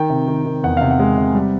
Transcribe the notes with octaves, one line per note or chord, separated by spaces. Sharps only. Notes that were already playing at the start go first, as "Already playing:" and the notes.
Already playing: D#3 G5
C3
D#3
D#3
E2 F#5
C3 F5
F#5
G#3
C3
G3